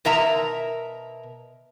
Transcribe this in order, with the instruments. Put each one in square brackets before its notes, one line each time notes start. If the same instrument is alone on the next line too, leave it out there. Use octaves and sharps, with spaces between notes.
[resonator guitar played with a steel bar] B2 A#4 E5 A#5